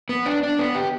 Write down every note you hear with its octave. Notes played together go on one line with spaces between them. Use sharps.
B3
D4
D4
B3
G4